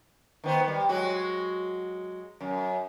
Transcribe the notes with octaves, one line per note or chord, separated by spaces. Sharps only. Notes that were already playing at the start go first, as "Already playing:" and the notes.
D#3 B3 C5
G3
F#3 G#3 F#4
F#2